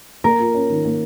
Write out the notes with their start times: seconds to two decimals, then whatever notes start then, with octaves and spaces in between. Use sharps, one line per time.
0.24 A#3 A#4
0.39 F4
0.54 C#4
0.70 D#3
0.85 A#3